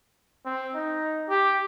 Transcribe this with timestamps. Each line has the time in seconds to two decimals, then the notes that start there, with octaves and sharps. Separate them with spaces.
0.45 C4
0.75 D#4
1.29 G4